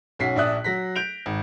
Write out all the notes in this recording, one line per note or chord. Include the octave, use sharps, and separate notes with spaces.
B1 C#4 F#4 B6 C7
A#1 D4 D5 E5 D#6 F#6
F#3 A#6 B6
G6 D7 F7
G#1